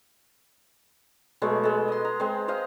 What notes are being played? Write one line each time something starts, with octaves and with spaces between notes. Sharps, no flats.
B2 F#3 G#3 A3
G#3 A4
D#5 C6
A#5
G#3 C4
C5 D#5 F5